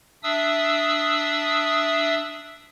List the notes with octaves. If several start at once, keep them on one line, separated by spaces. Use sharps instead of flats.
D4 E5 D#6 E6